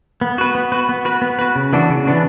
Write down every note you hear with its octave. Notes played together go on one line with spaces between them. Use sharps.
B3
F#4 B4
B3
F#4 B4
B3
F#4 B4
B3
F#4 B4
C#3
E3 B3 D4 F#4
C#3
E3 B3 D4 F#4